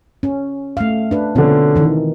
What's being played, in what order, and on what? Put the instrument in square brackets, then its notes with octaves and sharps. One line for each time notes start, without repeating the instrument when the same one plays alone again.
[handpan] C#4
A3 F5
D4 B4
[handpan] B2 C4 F4 [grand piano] D3 C#4
[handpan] D#3 E3